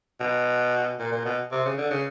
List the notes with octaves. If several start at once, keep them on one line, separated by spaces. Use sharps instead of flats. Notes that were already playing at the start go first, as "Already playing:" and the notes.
B2
A#2
A#2
B2
C3
C#3
D3
C#3